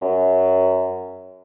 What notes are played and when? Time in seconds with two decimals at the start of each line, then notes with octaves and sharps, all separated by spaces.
0.02 F#2